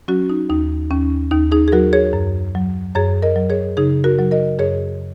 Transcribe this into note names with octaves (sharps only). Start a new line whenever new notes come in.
F#3 C#4 F#4
D#4
D#2 D#4
D#2 C#4
D#2 D#4
D#4 G#4
G#4
F#3 F#4 A#4
G#4 C#5
F#2
F#3
F#2 G#4 C#5
A#4 D#5
F#3
G#4 C#5
C#3 D#4 G#4
F#4 A#4
F#3
A#4 D#5
F#2 G#4 C#5